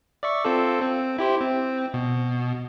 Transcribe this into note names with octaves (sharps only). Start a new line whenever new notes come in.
D5 E5 C#6
C4 F4 A4
C4
E4 G4 C5
C4
B2